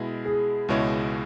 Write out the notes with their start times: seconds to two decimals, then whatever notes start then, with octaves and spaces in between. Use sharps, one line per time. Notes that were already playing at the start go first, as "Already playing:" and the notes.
Already playing: B2 G#3 E4
0.25 G#4
0.69 C#2 B2 G#3 E4 C#5